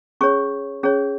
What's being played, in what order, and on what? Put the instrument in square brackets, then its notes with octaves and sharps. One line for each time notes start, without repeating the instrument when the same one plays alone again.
[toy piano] C#4 G#4 C#5 C#6
C#4 G#4 C#5